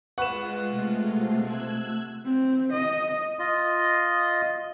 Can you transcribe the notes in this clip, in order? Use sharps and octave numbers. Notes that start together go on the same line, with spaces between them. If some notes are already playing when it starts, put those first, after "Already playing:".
G#3 F4 B4 F#5 C#6 F#6 E7
C3 A3
E6 F#6 G#6
C4
D#5
F4 D#5